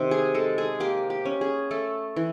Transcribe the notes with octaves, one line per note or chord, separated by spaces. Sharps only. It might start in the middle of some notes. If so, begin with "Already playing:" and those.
Already playing: C3 D#3
G#4
G#3 A4
G#4
A#3 G4
G4
C#4
G#4
A3 A4
E3